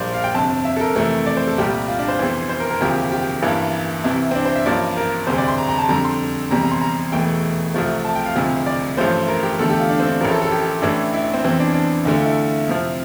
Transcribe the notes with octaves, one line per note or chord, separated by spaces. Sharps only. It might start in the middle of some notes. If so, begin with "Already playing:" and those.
Already playing: A#1 A#2 G3 A#3 C5 D5
F5
G5
G1 F2 C3 A5
E5
A4
A#4
F2 C3 E3 A3
D5
C5
A4
C2 A#2 G3 G4
F4
D4
C5
F1 E2 E3
C5
A#4
A#4
E1 D2 C3 F3 A#3 G4
G4
A1 G2 E3 A#3 E4
C2 C3 E3 E4
C4
D4
C5
E5
A1 G2 F3 A#3 D5
A#4
E1 D2 C3 G3 C5
D5
C6
A#5
A#5
A5
F2 D3 G3 A#5
C6
F1 E2 C3 G3 A#5
A#5
C6
A#5
E1 E2 E3 A3 G5
C2 C3 F3 A3
A5
G5
F5
E1 D2 C3 F3
D5
A1 G2 F3 A3 C5
A#4
G4
E2 D3 A3 A4
G4
F4
D4
C4
D4
A1 A2 F3 A#4
A4
A4
G4
A1 A2 E3 A3 D4
E4
E4
C4
F1 E2 E3 C4
D4
D4
D2 D3 A3 E4
F4
E4
F2 C3 F3